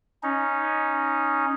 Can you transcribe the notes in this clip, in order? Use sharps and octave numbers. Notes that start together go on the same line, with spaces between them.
C#4 D#4